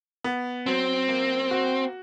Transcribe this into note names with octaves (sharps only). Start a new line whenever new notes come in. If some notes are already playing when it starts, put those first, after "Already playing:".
B3
F#3 C4
A#3
F#4